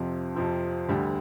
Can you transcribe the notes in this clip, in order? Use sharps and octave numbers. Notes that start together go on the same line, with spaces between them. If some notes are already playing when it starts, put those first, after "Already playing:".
Already playing: F2 C3 F3 C4
F2 C3 F3 C4
D2 D3 G3